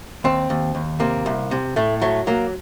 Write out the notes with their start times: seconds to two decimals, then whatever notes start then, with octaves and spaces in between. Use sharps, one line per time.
0.24 D#2 C4
0.50 D#2
0.75 D#2
1.00 C3 A#3
1.26 C2
1.51 C3
1.76 A2 A3
2.02 F#3 A3
2.27 F#3 A#3